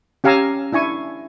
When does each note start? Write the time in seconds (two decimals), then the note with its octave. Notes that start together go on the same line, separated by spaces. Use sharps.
0.24 C#4 G4 F5 G#5 A#5 E6
0.72 D4 E4 G#5 C#6